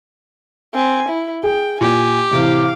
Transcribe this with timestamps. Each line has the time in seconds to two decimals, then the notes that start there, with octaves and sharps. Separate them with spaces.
0.74 C4 G#5
1.09 E4
1.43 G#4 G5
1.81 A#2 G4 G#5
2.31 A2 C3 E3 F5 D6